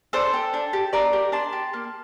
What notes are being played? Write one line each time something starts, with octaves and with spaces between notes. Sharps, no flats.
D4 A4 C5
G4
D4
G4
D4 A#4 D5
G4
D4 A5 C6
G4
A#3